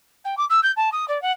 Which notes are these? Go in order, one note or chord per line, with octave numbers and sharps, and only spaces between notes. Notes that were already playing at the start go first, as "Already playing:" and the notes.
G5
D6
E6
G6
A5
D#6
D5
F#5